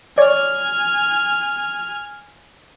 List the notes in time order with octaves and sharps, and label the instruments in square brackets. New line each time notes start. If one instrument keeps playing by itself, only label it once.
[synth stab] C#5 D5 [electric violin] G#5 F6